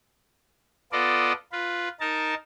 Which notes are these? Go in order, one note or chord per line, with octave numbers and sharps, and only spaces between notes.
B3 F4 A4 D5 D#5
F4 B4
D#4 A#4 A5